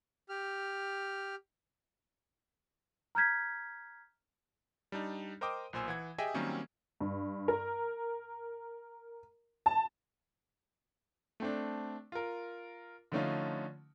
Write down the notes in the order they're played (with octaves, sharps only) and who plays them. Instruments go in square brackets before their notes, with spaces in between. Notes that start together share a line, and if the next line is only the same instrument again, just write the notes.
[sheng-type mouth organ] G4 F6
[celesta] A#5 F6 G6 G#6 B6
[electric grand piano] G3 D4 D#4
A#4 C5 D#5 G5 D6 D#6
B1 A#2 C5 G#5 E6
E3 F#5 G#6
G4 G#4 D#5 E5 G5 G#5
D#3 F#3 G3 A#3 C4 C#4
[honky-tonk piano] G2
A#4
A5
[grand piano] A3 C4 D4
F4 A#4
D3 F3 A3 C#4 D#4 F4